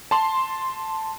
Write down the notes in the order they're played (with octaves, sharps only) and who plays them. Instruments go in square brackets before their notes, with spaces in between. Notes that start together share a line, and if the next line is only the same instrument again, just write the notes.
[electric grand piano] A5 C6